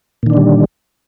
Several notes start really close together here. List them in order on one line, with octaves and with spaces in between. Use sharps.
A#2 D#3 D4 D3 G3